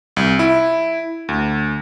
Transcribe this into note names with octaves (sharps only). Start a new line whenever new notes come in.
C2
E4
D2